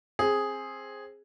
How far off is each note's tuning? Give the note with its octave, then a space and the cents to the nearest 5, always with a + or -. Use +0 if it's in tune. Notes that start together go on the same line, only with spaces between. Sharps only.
C4 +20 G#4 +0